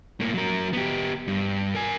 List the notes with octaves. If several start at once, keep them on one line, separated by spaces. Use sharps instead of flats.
A2 A#3
F#3 A#4
B3 G4
G2
A#4 G#5